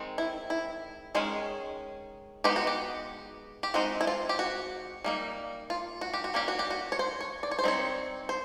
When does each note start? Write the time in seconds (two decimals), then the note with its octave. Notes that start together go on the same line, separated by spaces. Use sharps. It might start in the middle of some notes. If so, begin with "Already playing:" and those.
Already playing: D#3 G#3 C4
0.18 E4
0.50 E4
1.15 D#3 G#3 C#4 G#4
2.44 G#3 B3 D#4 G4
2.56 F#4
2.67 G4
3.63 G4
3.74 G#3 C4 D#4 F#4
4.01 E4
4.07 F4
4.29 G4
4.39 F#4
5.04 G3 A#3 D#4
5.70 F4
6.01 F#4
6.14 G4
6.24 F#4
6.34 G3 A#3 C#4 G4
6.48 F#4
6.59 G4
6.70 F#4
6.92 C#5
6.99 C5
7.21 C#5
7.43 D5
7.51 C#5
7.59 C5
7.64 G3 C4 D#4 C#5
8.29 C5